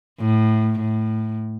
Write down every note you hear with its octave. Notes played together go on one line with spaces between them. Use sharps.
A2
A2